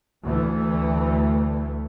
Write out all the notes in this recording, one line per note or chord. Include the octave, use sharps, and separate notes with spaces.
D2 E3 A3